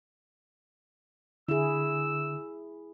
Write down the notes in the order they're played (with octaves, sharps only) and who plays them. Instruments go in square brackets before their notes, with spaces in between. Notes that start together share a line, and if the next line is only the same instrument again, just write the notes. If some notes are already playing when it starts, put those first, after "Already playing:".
[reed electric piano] D3 [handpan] E4 G#4 [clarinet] E6